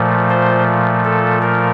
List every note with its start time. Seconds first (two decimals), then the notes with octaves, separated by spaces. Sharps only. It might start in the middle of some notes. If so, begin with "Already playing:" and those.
Already playing: A#2 F3 A3
0.30 C5
1.05 A4
1.42 A#4